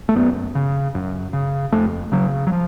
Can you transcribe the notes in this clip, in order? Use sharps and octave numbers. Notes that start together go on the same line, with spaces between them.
A3
F#2 B3
C#3
F#2
C#3
F2 A3
C#3 F#3
F#3
F3